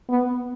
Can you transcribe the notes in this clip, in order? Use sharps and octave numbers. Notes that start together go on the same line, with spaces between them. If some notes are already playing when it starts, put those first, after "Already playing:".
B3